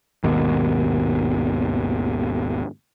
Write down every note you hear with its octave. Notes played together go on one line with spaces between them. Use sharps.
G#1 D#2 B2